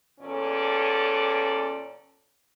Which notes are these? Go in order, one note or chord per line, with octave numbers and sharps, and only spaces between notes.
E2 A#2 C#4 A4 D5